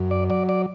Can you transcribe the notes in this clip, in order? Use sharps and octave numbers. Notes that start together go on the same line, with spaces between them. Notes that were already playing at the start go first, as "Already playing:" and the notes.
Already playing: F#2
D5
F#3 D5
D5